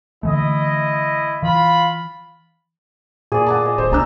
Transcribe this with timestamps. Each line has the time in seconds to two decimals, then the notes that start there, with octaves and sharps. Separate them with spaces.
0.23 D3 E3 A3 E4 D#5
1.43 E3 F4 B5
3.32 A#2 G#4 D5
3.46 F#5 G#5 A5
3.65 D#5
3.78 D1 C5
3.91 C2 B2 D4 D5 A#5 E6